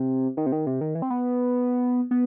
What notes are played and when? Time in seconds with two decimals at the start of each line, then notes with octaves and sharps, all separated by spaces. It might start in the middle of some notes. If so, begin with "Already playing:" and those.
Already playing: C3
0.37 D#3
0.46 C3
0.52 D#3
0.67 C3
0.81 D#3
0.95 E3
1.02 C4
1.10 B3
2.11 B3